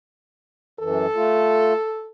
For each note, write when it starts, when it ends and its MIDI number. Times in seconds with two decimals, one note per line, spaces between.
0.80 1.06 42
0.80 1.06 52
0.80 2.08 69
1.15 1.73 57
1.15 1.73 65